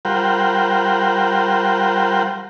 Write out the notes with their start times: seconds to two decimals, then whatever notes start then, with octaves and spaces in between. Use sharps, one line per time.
0.05 G3 F4 A#4 C5 F#5 G5